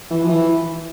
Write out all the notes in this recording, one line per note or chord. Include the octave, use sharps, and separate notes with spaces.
E3
F3
E3